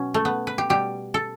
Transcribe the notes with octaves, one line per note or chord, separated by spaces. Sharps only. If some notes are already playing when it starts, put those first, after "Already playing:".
Already playing: B2 F#3 C#4
A3
B3
B4
G4
B2 G3 G4
A4